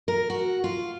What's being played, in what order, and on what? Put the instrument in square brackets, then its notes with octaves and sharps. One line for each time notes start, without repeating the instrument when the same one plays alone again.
[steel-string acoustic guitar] A#4
F#4
F4